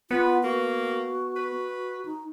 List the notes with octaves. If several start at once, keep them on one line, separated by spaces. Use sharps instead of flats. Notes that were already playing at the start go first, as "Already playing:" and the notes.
B3 F4 B4
A#3 F#4
B4
D#4